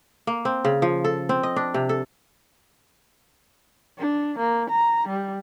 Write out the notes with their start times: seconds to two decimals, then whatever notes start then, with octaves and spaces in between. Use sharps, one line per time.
0.27 A#3
0.45 C4
0.65 C#3
0.82 F3
1.04 A4
1.29 C4
1.43 D#5
1.56 D4
1.74 C3
1.89 A4
3.98 D4
4.38 A#3
4.70 A#5
5.08 G3